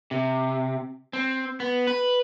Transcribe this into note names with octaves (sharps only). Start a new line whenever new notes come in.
C3
C4
B3
B4